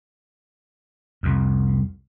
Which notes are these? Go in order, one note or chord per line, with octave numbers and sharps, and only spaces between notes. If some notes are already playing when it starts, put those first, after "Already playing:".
C2 F2